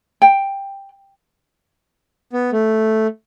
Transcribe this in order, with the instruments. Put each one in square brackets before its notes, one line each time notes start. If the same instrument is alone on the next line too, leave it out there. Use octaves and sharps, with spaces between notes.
[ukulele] G5
[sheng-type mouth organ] B3
A3